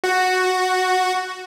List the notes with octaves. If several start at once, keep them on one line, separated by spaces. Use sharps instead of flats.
F#4